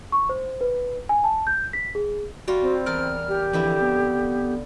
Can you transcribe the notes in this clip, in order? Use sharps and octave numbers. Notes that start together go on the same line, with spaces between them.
C#6
C5
B4
G#5
A5
G6
B6
G#4
G3 F4 F#4
C4
E2 A#4 D5 F6
G4
F2 D3 E3 E4
B3